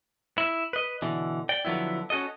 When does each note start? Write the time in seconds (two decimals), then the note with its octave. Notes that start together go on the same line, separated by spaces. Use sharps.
0.38 E4
0.73 B4 D#5
1.02 B2 D3 E3
1.49 D5 G5
1.65 D3 F3 F#3 B3 E4
2.10 C#4 F#4 A4 D#5